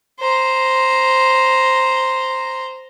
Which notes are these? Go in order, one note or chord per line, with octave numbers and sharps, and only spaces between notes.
C5 A#5